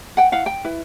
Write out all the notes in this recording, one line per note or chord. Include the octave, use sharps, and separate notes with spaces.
F#5 G5
E4 F5 F#5
G5
E4 B4